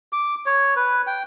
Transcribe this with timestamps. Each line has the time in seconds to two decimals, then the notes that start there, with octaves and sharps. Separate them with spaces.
0.13 D6
0.46 C#5
0.76 B4
1.07 G5